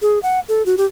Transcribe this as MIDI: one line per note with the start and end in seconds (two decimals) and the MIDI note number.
0.02 0.19 68
0.23 0.40 78
0.49 0.65 69
0.66 0.75 66
0.78 0.86 67